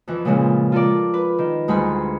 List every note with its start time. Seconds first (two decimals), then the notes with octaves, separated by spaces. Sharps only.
0.08 F2 E3
0.25 A#2 C#3 E3 F3 G#3
0.72 F4 A4 A#4 D5
1.14 B4
1.38 D#3
1.68 D2 G#2 G3 G#5 B5 C6